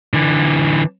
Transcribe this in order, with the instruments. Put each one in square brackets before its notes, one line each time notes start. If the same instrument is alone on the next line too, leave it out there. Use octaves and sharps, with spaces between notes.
[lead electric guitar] D3 E3